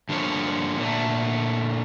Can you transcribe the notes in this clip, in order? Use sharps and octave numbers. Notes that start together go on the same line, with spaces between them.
G2 D3 F3 G3 A#3 C#5
A#2 D3 A3